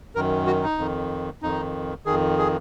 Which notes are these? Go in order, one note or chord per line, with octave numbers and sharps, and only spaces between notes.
F#2 D#3 A#4
F#4
D#4
F2 D#3
F2 D#3 D#4
F2 D#3 G#4
G#4